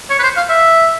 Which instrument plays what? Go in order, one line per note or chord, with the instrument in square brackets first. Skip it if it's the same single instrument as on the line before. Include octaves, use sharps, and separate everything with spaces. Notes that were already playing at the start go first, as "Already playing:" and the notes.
[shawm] C#5
B4
C5
F5
E5